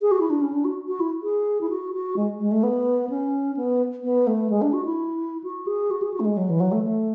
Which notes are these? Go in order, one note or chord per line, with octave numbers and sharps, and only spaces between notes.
G#4
F#4
E4
D4
C#4
D4
F#4
F#4
E4
G#4
E4
F#4
F#4
G#3
G#3
A3
B3
C#4
B3
B3
A3
G#3
D4
F#4
E4
F#4
G#4
F#4
G#4
F#4
A3
G#3
F#3
E3
F#3
A3
A3